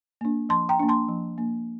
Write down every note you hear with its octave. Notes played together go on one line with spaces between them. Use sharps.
A#3 D4
F3 A5 C6
G5 A#5
A#3 D4
A5 C6
F3
A#3 D4